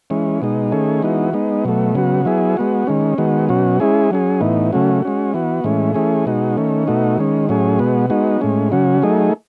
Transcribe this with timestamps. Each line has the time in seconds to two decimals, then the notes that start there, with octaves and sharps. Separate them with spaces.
0.10 E3 G#3 C#4
0.42 B2 G#3 D#4
0.72 D#3 A3 C#4 G#4
1.03 E3 G#3 B3 D#4 F#4
1.33 G#3 B3 D#4
1.64 B2 F#3 A3
1.95 C#3 F#3 B3 F#4
2.25 F#3 B3 E4 G#4
2.57 G#3 B3 F#4
2.87 D#3 G#3 C#4
3.18 D#3 G#3 B3 F#4
3.49 B2 F#3 C#4 F#4
3.80 G#3 C#4 E4 G#4
4.11 F#3 C#4 G#4
4.41 A2 E3 B3 D#4
4.72 C#3 F#3 A3 C#4 F#4
5.02 G#3 C#4 F#4
5.34 E3 B3 F#4
5.64 A2 E3 G#3 C#4
5.94 E3 A3 C#4 G#4
6.26 B2 G#3 D#4 F#4
6.57 D#3 A3 C#4
6.87 B2 A3 D#4 F#4
7.18 D#3 G#3 C#4
7.49 A2 F#3 C#4 G#4
7.79 B2 G#3 B3 F#4
8.10 G#3 B3 D#4 F#4
8.41 A2 G#3 C#4
8.72 C#3 F#3 C#4 F#4
9.02 F#3 A3 D#4 G#4